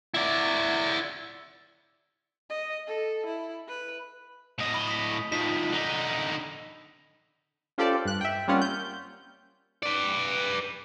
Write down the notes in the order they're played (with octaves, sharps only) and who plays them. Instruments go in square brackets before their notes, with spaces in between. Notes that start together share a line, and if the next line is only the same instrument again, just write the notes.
[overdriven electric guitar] E4 D5
[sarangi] D#5
A4
E4
B4
[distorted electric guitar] A2 D#5
[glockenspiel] B5
D#6 B6
[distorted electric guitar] D#3 F3 [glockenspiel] B6
[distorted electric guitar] D3 D#4
[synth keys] C#4 F4 G4 A4 C5 D5
G2 F#6
E5 G5
G3 A#3 C4 C#4 F4 F#5
G6
[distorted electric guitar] B4 D5